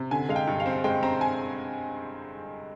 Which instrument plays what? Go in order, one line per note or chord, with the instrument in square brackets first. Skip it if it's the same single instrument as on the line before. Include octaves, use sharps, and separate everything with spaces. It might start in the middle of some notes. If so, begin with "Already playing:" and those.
Already playing: [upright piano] C3
D3 G#5
G#3 F5
G5
G2
F5
C4
G#3 G5
C4 A#5
G#5